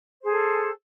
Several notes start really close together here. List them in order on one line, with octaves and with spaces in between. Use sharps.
C5 G#4 A4